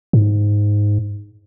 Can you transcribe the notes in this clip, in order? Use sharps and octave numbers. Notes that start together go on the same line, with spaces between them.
G#2